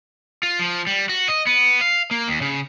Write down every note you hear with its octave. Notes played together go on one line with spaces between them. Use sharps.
F4
F3
G3
F#4
D#5
B3
F5
A#3
D#2
C#3